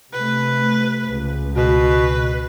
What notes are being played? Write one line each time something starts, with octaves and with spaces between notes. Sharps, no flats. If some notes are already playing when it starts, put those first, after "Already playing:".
C3 A3 B4
C#2
B2 B4